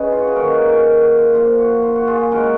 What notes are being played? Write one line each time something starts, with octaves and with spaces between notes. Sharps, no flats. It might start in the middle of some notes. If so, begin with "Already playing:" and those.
Already playing: C#3 D#4 G#4 B4 C#5 D#5
F4
F#4
G#4
D#3 A#3 C#4 F#4 A#4
F#4 A#4
F#4 A#4
F#4
F4
A#2 F3 A#3 F4
F#4
F4
F#4
F4 G#4
C#3 G#3 C#4 F#4 A#4